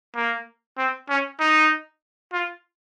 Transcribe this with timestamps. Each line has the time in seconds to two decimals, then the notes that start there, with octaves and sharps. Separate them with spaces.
0.16 A#3
0.78 C4
1.09 C#4
1.40 D#4
2.33 F4